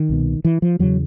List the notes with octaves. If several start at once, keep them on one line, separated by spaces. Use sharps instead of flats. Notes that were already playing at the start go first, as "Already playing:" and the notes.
Already playing: D#3
C2 B2
E3
F3
E2 C#3 F#3